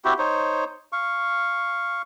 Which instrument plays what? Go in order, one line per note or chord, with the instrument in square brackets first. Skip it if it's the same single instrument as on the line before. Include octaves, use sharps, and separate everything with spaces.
[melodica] C4 E4 F#4 G4
D#4 C5 C#5
F5 C#6